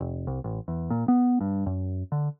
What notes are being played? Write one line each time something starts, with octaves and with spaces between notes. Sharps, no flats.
F1
C2
A1
E2
A#2
B3
G2
F#2
D3